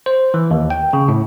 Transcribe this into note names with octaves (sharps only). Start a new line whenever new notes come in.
C5
E3
D#2
G5
C#3
A2